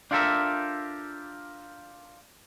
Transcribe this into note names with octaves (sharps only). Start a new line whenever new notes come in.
D4 F4 G4 A4 A#4 E5